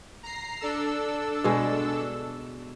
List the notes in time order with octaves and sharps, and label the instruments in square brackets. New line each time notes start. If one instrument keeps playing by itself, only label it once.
[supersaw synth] A#5 C7
D4 A4 E6
[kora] B2 G#3